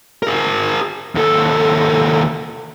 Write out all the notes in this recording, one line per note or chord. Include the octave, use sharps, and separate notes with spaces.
G#4 A#4
D#2 A4